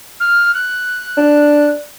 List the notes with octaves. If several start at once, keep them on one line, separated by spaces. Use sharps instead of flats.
F6
F#6
D4